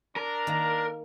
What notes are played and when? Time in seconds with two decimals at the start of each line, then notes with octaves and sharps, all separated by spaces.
0.16 D4 A#4 A#5
0.47 D#3 A#3